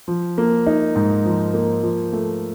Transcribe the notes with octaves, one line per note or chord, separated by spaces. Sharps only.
F3
A#3
D#4
G#2
F3
A#3
F3
A3